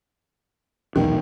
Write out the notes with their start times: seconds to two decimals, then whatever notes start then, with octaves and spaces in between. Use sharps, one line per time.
0.96 D#1 B1 E2 D#3